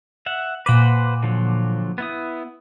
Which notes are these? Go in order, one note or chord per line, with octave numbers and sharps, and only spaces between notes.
E5 F#5
A#2 B4 C5 F#5 D6
D3 F3 F#3
B3 E4 D#6